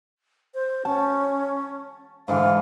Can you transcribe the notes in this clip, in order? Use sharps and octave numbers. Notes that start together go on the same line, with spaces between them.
C5
C#4 A5
G#2 D3 E3 F5